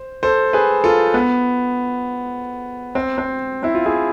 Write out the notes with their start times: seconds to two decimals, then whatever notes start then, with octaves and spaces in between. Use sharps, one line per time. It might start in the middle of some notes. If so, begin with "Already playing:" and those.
Already playing: C5
0.23 A4 C5
0.53 G#4 B4
0.84 F4 A4
1.14 B3
2.95 C4
3.18 C4
3.63 C4 E4
3.75 F4
3.86 E4 G#4